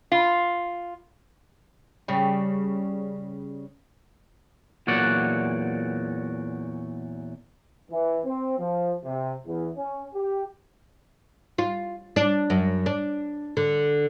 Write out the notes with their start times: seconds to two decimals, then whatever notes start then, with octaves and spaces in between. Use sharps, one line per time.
0.12 F4
2.08 C#3 G3
4.87 E2 A#2 F#3 F#4 D5 F#5
7.91 E3
8.26 C4
8.58 F3
9.04 C3
9.45 E2
9.76 C#4
10.14 G4
11.58 F4
12.16 D4
12.50 F#2
12.86 D4
13.57 D3